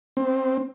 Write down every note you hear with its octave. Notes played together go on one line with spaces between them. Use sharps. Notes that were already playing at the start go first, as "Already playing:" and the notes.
C4